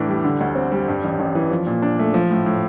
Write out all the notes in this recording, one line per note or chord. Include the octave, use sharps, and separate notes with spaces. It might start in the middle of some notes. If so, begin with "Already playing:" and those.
Already playing: A2 E3 D4
G3
D3
D2
C4
G3
G2
A1
A1
E3
F3
A#2
D4
A3
F3
A2
A2